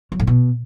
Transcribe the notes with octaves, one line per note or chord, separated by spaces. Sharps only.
F#3
A2
B2